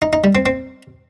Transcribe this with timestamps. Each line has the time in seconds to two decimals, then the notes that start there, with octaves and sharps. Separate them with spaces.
0.02 D#4
0.13 D#4
0.24 G3
0.35 C4
0.46 C4